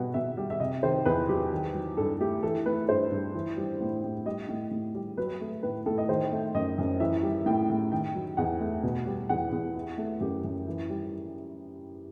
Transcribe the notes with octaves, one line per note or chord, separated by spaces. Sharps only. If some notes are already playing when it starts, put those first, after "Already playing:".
Already playing: B2 G3 F#5
B2 E5
G3
E5
C3 D#5
D#3 C5
E2 B4
F#3 G4
D#3
F#3
G2 A4
A3 G4
E3 A4
A3 B4
G2 C5
G2
E3
G3
A2
A2
G3 D#5
A2
A2
G3
F#3 B4
A3
A2 B4
A2 A4
D#5
D#3 C5
A3
F#2 D#5
F#2
E3 E5
G3
A2 G5
A2
D#3 G5
F#3
E2 F#5
A3
B2
G3
E2 F#5
E2
E3
A3
F#2 G4
F#2
E3
G3